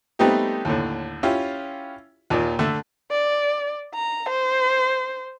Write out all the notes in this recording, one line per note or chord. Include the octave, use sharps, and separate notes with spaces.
G3 A3 B3 C4 D#4 G4
D#2 A2 D3
C#4 E4 F4 G4
D#2 A#2 D#3 D5
D3 A3 A4 E5
D5
A#5
C5